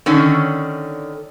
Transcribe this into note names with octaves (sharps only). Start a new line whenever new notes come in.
D3 D#3 C#4